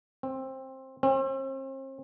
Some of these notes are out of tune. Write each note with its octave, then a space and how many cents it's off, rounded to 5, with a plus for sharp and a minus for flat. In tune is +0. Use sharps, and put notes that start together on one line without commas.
C4 +15
C4 +40